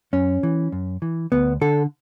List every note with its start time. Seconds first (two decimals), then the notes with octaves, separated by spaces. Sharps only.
0.13 F#2 C#4
0.43 E3
0.72 F#2
1.02 E3
1.32 D2 B3
1.61 D3 A4